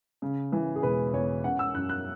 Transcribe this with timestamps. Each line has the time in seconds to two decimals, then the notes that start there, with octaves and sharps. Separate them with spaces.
0.22 C#3
0.52 E3
0.75 G#4
0.83 E1 B4
1.13 E2 C#5
1.44 C#4 F#5
1.59 E6
1.75 F#2 F#6
1.89 F#6